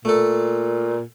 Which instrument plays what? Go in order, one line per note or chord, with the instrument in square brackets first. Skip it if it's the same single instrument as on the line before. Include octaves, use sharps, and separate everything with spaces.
[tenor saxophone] A#2 [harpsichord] A3 A4